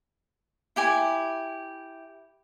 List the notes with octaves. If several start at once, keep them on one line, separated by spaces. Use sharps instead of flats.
E4 G4 G#5